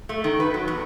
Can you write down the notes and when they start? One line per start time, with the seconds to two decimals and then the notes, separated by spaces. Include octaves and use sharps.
0.09 A3
0.24 D#3
0.40 B4
0.54 F#3
0.68 E2